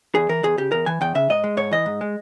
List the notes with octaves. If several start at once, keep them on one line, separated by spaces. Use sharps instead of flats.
E2 G#4
E3 A#4
E2 G#4
C#3 G4
E2 A#4
E3 G#5
E2 G5
C#3 E5
G#2 D#5
G#3
G#2 C#5
E3 D#5
G#2
G#3